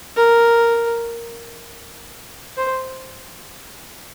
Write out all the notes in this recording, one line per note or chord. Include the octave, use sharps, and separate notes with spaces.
A#4
C5